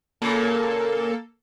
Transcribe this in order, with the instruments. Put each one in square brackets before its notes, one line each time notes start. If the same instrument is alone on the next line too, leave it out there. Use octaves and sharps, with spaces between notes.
[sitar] A#2 C#3 [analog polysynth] A#3 A4